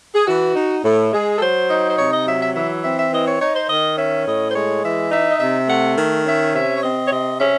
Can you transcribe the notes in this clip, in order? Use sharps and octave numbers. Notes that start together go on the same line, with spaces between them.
G#4
E3 F#4
D#4
A2
G#3 G#4
A4
F#3 C5
D#4
C5
C3 C#5
D#5
F#3 E5
E5
E3 E5
C4 E5
E5
E3 D#5
C#5
D#4 C#5
C5
D#3 D#5
C#4 E5
A2 D#5
C5
G#3 C#5
E3 E5
D#4 E5
D#5
C3 E5
A3 F#5
D#3
C#4 E5
C3 E5
C#5
C4 D#5
C#5
C3 D#5
C#4 E5